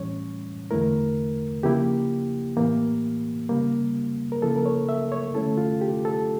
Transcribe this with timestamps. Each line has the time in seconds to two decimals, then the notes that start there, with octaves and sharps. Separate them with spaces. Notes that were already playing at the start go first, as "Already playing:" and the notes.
Already playing: A2 E3 G3 C#4 C#5
0.71 E2 D3 A3 E4 A#4
1.63 C#3 F3 A#3 E4 G4
2.57 A2 E3 A#3
3.49 C#3 G3 A#3
4.32 A#4
4.42 C#3 F3 A#3 E4 A4
4.56 A#4
4.66 C#5
4.89 E5
5.12 C#5
5.34 D3 A3 C#4 E4 A4
5.58 F4
5.81 G4
6.05 A4